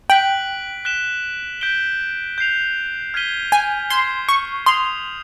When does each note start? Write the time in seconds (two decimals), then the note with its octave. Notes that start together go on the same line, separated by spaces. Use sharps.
0.10 G5 F#6 B6 D7 F#7
0.85 F#6 B6 E7 G7
1.61 G6 B6 D7 G7
2.38 G6 C7 F7
3.14 F6 G#6 B6 D#7 G7
3.52 G#5
3.90 C6 G#6 C7 E7 G7
4.29 C#6
4.66 C6 D#6 G#6 C7 F7